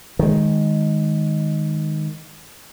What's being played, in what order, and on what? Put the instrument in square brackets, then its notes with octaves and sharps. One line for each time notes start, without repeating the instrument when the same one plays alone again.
[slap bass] D#3 G#3